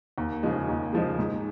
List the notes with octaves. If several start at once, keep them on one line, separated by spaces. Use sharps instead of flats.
D#2
C#3 F3 G#3
D#2
C#3 F3 G#3
G#2